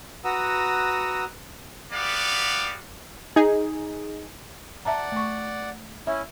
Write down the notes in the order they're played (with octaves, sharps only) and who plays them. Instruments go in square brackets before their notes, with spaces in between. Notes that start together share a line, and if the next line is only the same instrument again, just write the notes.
[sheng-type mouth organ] F#4 B4 F#5 A#5 D#6 E6
[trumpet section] B3 F#4 G4 D5 F5
[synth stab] D#4 G#4
[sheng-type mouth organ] D5 F#5 [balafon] E5 A5 A#5
[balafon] A3 C#6
[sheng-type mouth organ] C#4 E4 [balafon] E5